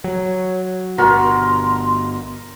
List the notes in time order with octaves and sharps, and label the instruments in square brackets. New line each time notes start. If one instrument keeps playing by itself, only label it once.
[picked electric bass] F#3 [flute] C#5
[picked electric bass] G1 B2 [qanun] F#4 [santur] A#4 [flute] C6